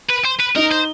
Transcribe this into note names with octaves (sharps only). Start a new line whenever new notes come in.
B4
C5
B4
D#4 A#4
C5